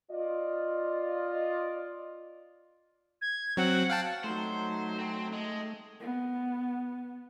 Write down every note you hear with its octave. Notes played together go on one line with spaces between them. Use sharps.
F4 D5 D#5
G#6
F#3 C4 F#5
F5 G5 A5
F#3 A3 D#4 C5
C4
G#3
B3